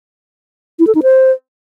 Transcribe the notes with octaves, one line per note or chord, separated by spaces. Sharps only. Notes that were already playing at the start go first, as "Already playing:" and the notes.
E4
A4
D#4
C5